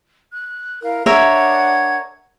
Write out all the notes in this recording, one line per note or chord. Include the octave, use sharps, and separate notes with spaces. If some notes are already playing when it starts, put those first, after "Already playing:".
F#6
E4 A#4 F5
D4 A#4 C#5 E5 F#5 G#6